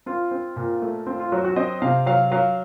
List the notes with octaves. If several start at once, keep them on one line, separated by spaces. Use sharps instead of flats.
C4 F4
C4
A#2
A3
C4 F4
F4
F#3 F#4
F#4
C4 D#5
C3 F5
F#3 F5
F#3 F5